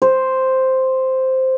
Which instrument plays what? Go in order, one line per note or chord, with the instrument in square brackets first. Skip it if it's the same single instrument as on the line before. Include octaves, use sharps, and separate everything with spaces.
[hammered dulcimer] C5